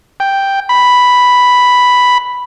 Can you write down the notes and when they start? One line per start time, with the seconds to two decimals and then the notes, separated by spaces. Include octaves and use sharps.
0.20 G5
0.69 B5